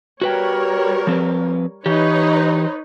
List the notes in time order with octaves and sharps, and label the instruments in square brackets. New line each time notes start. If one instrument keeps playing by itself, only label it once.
[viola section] G3 A#4 C#5 [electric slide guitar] F#4 B4 G5
[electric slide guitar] F3 C4 B4
[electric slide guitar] E3 G4 [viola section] D#4 B4 C#5